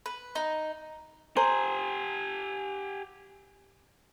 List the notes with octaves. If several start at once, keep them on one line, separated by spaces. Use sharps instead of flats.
B4
D#4
G4 C5 G#5 A#5